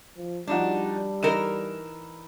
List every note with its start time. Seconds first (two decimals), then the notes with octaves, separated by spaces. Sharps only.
0.16 F3
0.47 F3 G3 D4 D#4 F#4
1.23 E3 D#4 A#4 E7